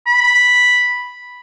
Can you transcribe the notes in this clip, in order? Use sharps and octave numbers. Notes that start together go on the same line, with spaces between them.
B5